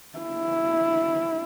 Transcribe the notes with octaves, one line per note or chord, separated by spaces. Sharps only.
E4